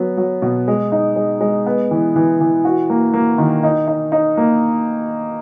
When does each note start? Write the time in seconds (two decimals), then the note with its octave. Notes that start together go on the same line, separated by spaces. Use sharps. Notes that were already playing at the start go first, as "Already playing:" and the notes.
Already playing: F#3 B3
0.17 F#3
0.42 B2
0.68 G#3
0.92 D#4
1.16 G#3
1.41 G#3
1.66 B3
1.91 E3
2.16 E3
2.40 E3
2.65 F#4
2.90 A#3
3.14 A#3
3.38 D#3
3.63 D#4
3.88 D#4
4.12 D#4
4.37 A#3